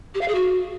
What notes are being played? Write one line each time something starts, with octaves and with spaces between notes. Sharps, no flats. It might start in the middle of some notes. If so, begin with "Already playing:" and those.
G4
F5
G#4
F#4